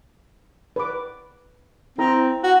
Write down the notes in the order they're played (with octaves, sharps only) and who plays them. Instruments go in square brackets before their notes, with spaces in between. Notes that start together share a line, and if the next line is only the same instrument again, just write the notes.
[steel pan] B4 D6
[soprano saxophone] C4 [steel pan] E4 A4 A#5
[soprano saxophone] F#4